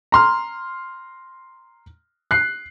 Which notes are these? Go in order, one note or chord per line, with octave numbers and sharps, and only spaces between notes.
A#5 C6 F6
F#6 C7